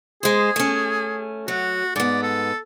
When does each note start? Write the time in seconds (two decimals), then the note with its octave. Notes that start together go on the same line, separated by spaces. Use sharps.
0.23 G#3 G#4 C5
0.56 A3 C#4
1.48 F#3 F#4
1.96 G#2 B3 D5
2.23 A4